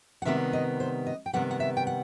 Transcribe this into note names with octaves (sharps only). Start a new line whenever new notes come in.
F#5
C3 D#3 G3 B3 E5
D#5
C5
D#5
G5
C3 D#3 G3 B3 F#5
F#5
E5
G5
F#5